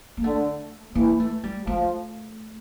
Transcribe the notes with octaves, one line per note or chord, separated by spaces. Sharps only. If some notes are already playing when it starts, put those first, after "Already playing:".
A#3
D3 A3
E3 A#3
A3
G3
F3 A3